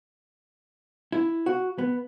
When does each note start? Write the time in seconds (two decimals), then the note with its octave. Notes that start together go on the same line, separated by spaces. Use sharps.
1.12 E4
1.46 F#4
1.78 B3